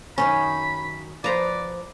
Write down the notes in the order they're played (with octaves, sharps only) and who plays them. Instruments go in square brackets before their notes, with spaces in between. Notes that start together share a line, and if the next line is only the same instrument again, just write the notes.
[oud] F#2 D#3 F#3 [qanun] C#4 [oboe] B5
[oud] F3 C5 [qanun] B4 A#5 [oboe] D5